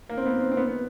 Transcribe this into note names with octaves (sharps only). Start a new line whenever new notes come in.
A#3
C4
B3
C4
C4
B3
B3